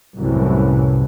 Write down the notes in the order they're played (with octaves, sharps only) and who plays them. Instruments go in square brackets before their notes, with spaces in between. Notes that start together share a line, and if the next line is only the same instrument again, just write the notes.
[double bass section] C2 F#2 A2 E3